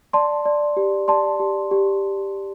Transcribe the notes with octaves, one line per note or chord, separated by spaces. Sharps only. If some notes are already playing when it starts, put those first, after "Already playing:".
D5 A5 C6
D5
G4
D5 A5 C6
G4
G4